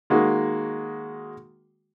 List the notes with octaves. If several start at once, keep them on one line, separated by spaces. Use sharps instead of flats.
D#3 G#3 A#3 F#4